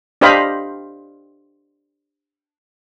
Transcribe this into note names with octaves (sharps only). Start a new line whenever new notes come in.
D4 G4 C5 D#5 F5 B5